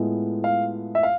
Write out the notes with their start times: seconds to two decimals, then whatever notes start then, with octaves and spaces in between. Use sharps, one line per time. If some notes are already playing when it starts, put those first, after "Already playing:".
Already playing: A2 G#3 B3 F4
0.44 F5
0.95 E5
1.03 F5